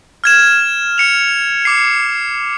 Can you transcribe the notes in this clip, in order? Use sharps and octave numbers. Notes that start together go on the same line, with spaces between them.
F6 G#6 E7
F6 C#7 F7
D6 C7